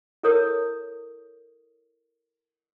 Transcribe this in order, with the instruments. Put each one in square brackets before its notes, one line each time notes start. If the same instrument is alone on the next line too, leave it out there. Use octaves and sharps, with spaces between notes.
[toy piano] E4 A4 A#4 C#5 D#6